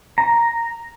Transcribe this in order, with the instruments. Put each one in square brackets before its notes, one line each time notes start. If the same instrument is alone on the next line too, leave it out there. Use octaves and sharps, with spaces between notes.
[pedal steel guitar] A#5